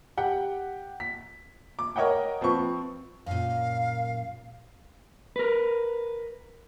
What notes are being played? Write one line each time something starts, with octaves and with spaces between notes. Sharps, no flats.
G4 F#5 G5
B6
D6
A#4 C#5 D#5 F#5 G5
F3 C4 B4 C#6
F#2 A#2 F5
A#4 B4